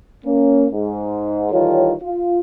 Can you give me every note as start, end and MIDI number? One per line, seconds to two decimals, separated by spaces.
0.25 0.66 58
0.25 0.66 61
0.72 1.46 44
1.50 1.92 51
1.50 1.92 52
1.50 1.92 55
1.50 1.92 65
1.50 1.92 69
1.50 1.92 73
2.02 2.38 65